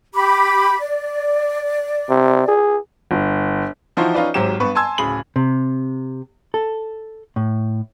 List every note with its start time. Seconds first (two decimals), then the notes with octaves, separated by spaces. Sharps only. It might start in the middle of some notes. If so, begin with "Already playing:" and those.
0.14 G4 B5 D6
0.79 D5
2.09 C3
2.48 G#4
3.11 G1
3.97 E3 F3 D#4 E4 F#4 C5
4.14 C#4 D#4 F4 B4 D5
4.34 G#1 G#2 F#3 G4 E7
4.60 G2 B3 B4 C#6
4.75 G#5 A5 C6 E6 G#6
4.98 D1 C#3 G#4 B5 F#7
5.36 C3
6.54 A4
7.36 A2